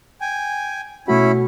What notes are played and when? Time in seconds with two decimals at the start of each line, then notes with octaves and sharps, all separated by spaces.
0.21 G5 G#5
1.08 B2 A3 C#4 E4 F#4 B5